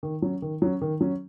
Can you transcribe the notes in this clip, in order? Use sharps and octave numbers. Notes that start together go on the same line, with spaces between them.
D#3
F#3 C#4
D#3
F#3 C#4
D#3
F#3 C#4